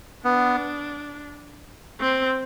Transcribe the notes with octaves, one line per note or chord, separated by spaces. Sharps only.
B3 D4
C4